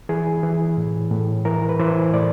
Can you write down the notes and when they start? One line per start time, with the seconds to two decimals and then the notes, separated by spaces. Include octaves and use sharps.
0.09 E3 G#4
0.43 E3
0.77 A2
1.11 A2
1.45 E3 A#4
1.69 B4
1.79 E3 C5
2.14 A2 D5